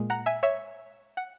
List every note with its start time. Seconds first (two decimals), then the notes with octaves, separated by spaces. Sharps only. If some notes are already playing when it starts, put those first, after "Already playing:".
Already playing: A#2 G#3
0.10 F#5 A#5
0.26 E5 G#5
0.43 C#5 E5
1.17 F#5